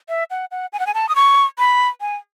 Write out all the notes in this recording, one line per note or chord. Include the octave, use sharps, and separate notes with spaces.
E5
F#5
F#5
G#5
F#5
G#5
A5
D#6
C#6
B5
G#5